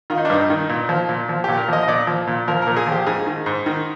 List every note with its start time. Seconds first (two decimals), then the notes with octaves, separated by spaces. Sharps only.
0.10 D#3 F4
0.18 D#4
0.25 D4
0.30 G2 D#4
0.50 D#3
0.69 A#2
0.89 F3
1.09 A#2
1.29 F3
1.44 A#2 G4
1.58 A#4
1.68 F3 D#5
1.83 D#5
1.88 A#2 D5
2.07 F3
2.27 A#2
2.48 F3 A#4
2.62 A#2 A#4
2.76 G#4
2.87 F3 G4
3.06 G#2 G#4
3.27 D#3
3.46 G#2
3.66 D#3